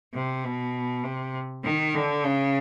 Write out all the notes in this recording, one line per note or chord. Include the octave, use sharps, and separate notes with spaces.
C3
B2
C3
D#3
D3
C#3